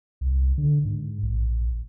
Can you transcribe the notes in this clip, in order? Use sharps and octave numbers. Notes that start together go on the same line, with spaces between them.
C2
D3
G#2
A#1